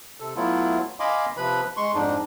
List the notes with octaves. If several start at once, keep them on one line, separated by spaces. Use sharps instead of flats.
C3 A4
F#3 A3 B3 E4 F4
D#5 F5 G#5 B5 C6 D6
C3 F3 B4 B5
G#3 C6 C#6
F2 G#2 D4 D#4